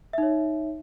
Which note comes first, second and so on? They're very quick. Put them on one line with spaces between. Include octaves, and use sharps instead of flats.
E5 D#4 C#5